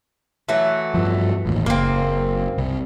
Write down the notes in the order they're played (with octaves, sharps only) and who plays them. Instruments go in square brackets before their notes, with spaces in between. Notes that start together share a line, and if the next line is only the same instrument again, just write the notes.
[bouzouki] E3 F#3 A3
[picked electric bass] G2 F3
A1 D#2
[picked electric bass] F#1 [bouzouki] A#3 C4
[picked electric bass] C2